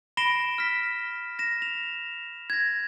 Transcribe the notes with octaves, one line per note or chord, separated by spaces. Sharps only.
B5 A#6 C7 D7 E7 G7
F6 B6
A#6 E7
F7
G#6 A#6